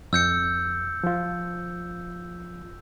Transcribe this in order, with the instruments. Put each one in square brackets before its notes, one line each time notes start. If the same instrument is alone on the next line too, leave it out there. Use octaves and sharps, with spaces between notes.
[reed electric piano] F2 [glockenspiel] E6 G6 C#7
[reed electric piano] F3 F4